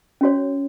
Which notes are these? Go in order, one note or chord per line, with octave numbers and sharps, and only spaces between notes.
C#4 F#4 C#5